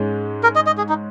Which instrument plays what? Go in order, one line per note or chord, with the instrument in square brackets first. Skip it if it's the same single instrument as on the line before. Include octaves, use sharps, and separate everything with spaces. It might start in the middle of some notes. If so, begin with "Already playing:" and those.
Already playing: [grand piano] G#2 G#3 C#4
[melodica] A#4
D#5
D#5
G#4
D#4